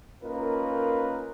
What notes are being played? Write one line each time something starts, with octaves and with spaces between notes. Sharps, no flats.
A#3 C#4 D#4 F4 A#4 B4